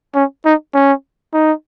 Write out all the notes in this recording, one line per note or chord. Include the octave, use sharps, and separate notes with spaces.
C#4
D#4
C#4
D#4